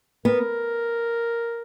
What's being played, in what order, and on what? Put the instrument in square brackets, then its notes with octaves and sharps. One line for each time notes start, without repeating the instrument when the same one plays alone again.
[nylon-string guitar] B3 [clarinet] A#4